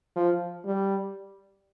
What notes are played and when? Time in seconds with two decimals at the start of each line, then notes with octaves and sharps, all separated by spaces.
0.16 F3
0.65 G3